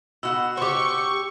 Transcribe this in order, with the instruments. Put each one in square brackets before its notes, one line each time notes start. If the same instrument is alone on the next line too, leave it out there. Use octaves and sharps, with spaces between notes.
[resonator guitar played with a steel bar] B2 F#4 F#5 [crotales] E6
[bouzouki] G4 C5 [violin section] C#6